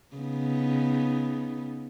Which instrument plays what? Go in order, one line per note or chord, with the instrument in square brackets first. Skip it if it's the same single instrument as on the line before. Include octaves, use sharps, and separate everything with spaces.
[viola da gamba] C#3 B3 D#4